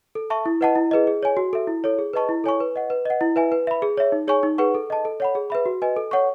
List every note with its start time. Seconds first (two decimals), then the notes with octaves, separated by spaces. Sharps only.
0.15 A4
0.30 E5 A5 C#6
0.46 E4
0.61 B4 D#5 F#5 A5
0.75 E4
0.91 G#4 B4 D#5
1.07 G#4
1.23 C#5 G#5
1.37 F#4
1.53 A4 E5
1.67 E4
1.84 A4 C#5
1.99 G#4
2.13 B4 D#5 A5 C#6
2.29 E4
2.44 A4 C#5 G#5 C#6
2.60 B4
2.76 D#5 F#5
2.90 B4
3.05 D#5 F#5
3.21 E4
3.36 B4 E5 G#5
3.52 B4
3.67 E5 B5
3.82 G#4
3.97 C#5 E5
4.12 D#4
4.28 G#4 C#5 G#5 C#6
4.43 D#4
4.58 G#4 B4 F#5 C#6
4.75 A4
4.90 D#5 A5
5.05 A4
5.20 C#5 F#5 B5
5.35 G#4
5.50 B4 E5 B5
5.66 F#4
5.82 B4 D#5 G#5
5.96 A4
6.11 C#5 F#5 C#6